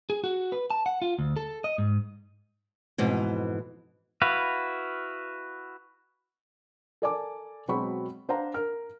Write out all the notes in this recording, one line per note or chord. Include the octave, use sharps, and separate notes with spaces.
G#4
F#4
B4
A5
F#5
F4
D2
A4
D#5
G#2
F2 G#2 B2 E3
E4 F#4 B4 F5
A4 A#4 D5 G#5 A5 D6
B2 F#3 G#3 C4 B5 C#6
D4 C5 F5 F#5 A#5
A#4 F6